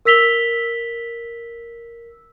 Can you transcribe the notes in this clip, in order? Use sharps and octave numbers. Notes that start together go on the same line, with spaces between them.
A#4 E6 B6 F7 G7